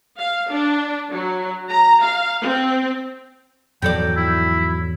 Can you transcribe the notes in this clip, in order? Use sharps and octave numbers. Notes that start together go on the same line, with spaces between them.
F5
D4
F#3
A#5
F5
C4
E2 G#2 F3 F#3 A4 D5 G5
E4